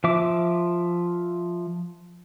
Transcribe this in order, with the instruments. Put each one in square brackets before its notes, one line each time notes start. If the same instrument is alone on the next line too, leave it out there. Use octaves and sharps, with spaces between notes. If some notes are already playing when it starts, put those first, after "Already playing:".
[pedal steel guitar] F3 E5 D6